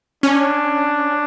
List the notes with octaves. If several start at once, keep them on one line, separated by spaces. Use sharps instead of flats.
C#4 D4